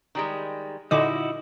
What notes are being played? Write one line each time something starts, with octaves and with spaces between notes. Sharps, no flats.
D#3 G3 G#3
A#2 D3 D#4 E4 F#4 D#5 D6